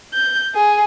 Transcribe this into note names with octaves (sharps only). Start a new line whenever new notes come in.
G6
G#4